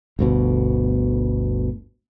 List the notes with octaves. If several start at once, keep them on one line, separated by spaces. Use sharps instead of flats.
G1 D2 B2